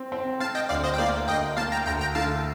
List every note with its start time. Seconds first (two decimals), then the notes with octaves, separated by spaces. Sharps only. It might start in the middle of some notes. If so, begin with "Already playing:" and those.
Already playing: C4
0.12 C4
0.40 C4 F5 A5
0.55 D#5 G5
0.69 D2 D5 F5
0.84 C5 D#5
0.94 G5
0.98 A#3 D5 F5
1.28 D2 D#5 G5
1.57 A#3 F5 A5
1.72 G5 A#5
1.86 D2 G5 A#5
2.01 G5 A#5
2.15 D3 F5 A5